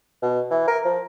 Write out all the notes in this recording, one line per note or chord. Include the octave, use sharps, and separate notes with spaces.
B2
E3
A#4
F3